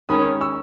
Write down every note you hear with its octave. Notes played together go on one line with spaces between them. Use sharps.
D#3 G#3 C#4 B5 D#6
C#6 E6